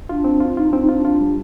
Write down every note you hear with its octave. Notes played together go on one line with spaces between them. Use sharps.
D4 F4
C4
F4
D#4 F4
D4
C4
D#4
D4 F4
F4
G3